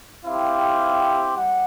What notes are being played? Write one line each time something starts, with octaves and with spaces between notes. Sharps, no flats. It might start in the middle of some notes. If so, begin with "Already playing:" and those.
C4 E4 G4 F5
G3 F#5